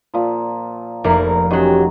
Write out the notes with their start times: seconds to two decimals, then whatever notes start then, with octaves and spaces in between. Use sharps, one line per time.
0.14 A#2 F3
1.04 F1 A#3 E4 A#4
1.51 E2 D#3 F#3 C#4 F#4 G4